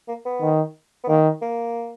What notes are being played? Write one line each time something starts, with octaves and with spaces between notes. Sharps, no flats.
A#3
B3
D#3
B3
D#3 A#3
A#3